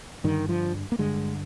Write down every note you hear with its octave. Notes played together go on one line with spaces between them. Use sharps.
G2 D3 D#3
F3
A#3
G2 D3 G#3